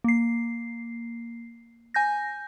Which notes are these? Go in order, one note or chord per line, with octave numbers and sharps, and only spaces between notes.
A#3 C7
G#5 G6 A#6